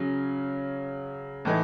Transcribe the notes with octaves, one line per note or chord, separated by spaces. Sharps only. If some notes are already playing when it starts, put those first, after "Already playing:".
Already playing: C#3 F#3 C#4
A2 E3 A3 D#4